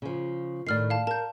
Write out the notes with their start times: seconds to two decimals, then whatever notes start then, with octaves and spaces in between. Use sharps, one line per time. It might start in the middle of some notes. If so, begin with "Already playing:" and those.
0.02 C#3 F3
0.67 A2 D#3 D5 F6 C7
0.90 F5 A5
1.07 A#4 A5 G6